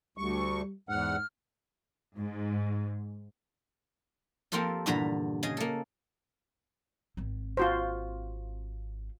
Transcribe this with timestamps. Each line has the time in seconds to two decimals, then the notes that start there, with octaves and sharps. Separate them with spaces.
0.18 D2 G3 C#6
0.89 E2 G#2 F#5 F6
2.15 G#2
4.52 F3 A#3 C4 F4 G4 A4
4.86 E2 G2 A#2 D3 A#5 B5
5.43 C#3 G#4 D#5
5.57 A#3 A4
7.17 G#1 C4
7.57 F4 F#4 C5